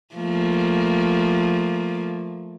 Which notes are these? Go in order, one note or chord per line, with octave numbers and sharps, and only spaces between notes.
F3 A3 A#3